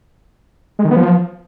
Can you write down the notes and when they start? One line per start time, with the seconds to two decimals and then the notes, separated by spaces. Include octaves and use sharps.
0.79 G#3
0.85 D#3
0.91 B3
0.97 F3